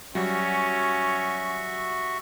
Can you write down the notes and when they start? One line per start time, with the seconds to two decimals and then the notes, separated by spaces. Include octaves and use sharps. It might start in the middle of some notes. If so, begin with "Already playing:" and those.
0.15 F#3 G3 C#4 F#4 E5 C#6